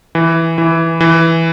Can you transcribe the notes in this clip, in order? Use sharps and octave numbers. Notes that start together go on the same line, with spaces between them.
E3
E3
E3